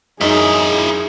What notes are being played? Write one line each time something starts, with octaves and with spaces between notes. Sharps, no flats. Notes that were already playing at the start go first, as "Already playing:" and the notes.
F#2 D#4 E4 G#4 D#5